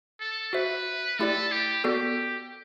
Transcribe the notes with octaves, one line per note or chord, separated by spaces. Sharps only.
A4
F#4 B4 C5 E5
A3 E4 G4 A4 D5
G4
B3 F#4 G4 A4 D5